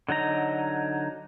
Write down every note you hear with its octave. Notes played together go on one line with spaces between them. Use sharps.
D3 F#3 D#4 A#5